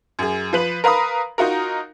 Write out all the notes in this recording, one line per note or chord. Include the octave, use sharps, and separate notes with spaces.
F#2 G#4
F3 B4 F#7
A#4 B4 F5 A#5 B5 D#6
D#4 F4 F#4 A#4